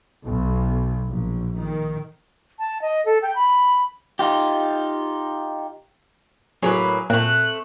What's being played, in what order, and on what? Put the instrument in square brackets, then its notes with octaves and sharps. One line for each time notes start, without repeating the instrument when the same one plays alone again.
[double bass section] B1
A#1
D#3
[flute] A5
D#5
A4
G5
B5
[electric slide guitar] D#4 F4 G4
[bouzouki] A2 A#3 B4 [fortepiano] F#3 G#4
[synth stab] A#2 [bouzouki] A3 C4 [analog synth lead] F#6